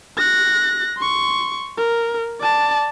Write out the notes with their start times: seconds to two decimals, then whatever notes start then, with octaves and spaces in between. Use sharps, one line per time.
0.18 F#6 A#6
0.97 C6 C#6
1.77 A#4
2.40 D5 A5